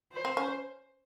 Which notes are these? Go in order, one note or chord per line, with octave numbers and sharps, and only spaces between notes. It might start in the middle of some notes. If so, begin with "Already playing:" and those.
C5
C4
C#4